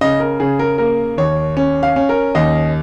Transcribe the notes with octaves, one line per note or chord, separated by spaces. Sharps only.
C#3 D#5
A#4
C#3 G#4
A#4
A#3 A#4
D#2 C#5
C#4
F5
C#4
A#4
D#2 D#5